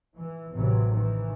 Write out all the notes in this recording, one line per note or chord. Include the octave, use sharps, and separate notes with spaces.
E3
A1 C3 E3 F#3
D#3 E3